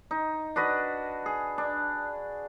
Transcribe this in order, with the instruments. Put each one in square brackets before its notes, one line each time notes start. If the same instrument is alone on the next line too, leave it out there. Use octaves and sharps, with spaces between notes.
[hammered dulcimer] D#4
D4 F#4 B4 D#5
G#4
D4